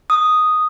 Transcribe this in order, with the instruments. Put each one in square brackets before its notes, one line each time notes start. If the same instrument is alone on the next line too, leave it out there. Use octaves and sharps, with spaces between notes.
[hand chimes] D#6